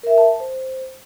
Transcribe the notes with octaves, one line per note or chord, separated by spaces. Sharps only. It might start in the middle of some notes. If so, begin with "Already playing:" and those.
A#4 E5
A5
C5